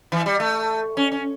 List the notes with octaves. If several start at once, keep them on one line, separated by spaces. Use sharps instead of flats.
E3
G3
A3
C#4
C#4